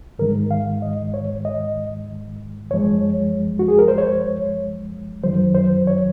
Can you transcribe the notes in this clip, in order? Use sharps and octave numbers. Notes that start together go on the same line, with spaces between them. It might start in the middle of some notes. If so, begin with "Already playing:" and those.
G#2 D#3 G#3 A#4
F5
D#5
C#5
D#5
F#2 F3 G#3 C#5
F#4
G#4
A#4
C5
C#5
F#2 D#3 F#3 C5
C5
C#5